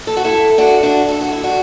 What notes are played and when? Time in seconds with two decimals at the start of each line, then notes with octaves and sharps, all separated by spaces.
0.07 A4
0.17 F#4
0.24 E4 A4
0.58 D4 F#4
0.83 D4 F#4
1.09 A4
1.21 F#4
1.32 E4
1.43 D4 F#4